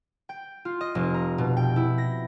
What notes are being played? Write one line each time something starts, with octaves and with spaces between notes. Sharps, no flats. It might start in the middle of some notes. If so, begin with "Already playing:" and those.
G5
F4
D#5
F1
A#5
B2
G5
E4
A#6